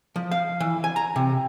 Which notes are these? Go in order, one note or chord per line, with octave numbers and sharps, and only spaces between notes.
F3
F5
E3
G#5
A#5
C3